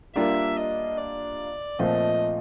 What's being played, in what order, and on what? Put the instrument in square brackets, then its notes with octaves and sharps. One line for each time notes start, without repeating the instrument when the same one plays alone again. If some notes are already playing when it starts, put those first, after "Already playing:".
[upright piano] G3 A#3 D4 F4 [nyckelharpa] E5
[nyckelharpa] D#5
D5
[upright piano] A#2 F3 A3 C4 [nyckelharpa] D#5